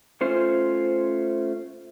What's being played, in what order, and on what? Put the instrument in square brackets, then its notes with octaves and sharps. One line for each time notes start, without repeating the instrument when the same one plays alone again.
[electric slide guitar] A3 C#4 F4 C5